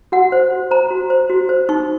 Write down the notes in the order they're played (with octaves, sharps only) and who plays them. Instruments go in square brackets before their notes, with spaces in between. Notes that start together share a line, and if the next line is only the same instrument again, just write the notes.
[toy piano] F#4 F#5
C5
F#4
C5 A#5
F#4
C5
F#4
C5
D#4 C#6